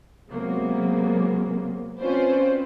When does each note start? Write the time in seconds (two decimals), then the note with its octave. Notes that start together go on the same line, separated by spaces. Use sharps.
0.29 C3 F#3 G#3 A#3 B3
2.00 C4 C#4 F4 B4 C5 D5